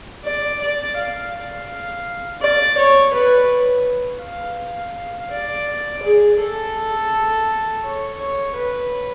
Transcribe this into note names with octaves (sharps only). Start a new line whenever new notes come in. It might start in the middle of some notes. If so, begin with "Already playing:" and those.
D5
D5
F5
D5
C#5
B4
F5
D5
G#4
A4
C#5
C#5
B4